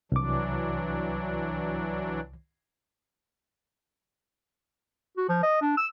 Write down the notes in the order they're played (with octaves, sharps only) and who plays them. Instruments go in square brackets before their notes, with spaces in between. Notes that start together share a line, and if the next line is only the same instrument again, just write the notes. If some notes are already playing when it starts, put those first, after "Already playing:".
[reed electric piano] C2 D6 [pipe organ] E3 F#3 D4
[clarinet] F#4
F3
D#5
D4
E6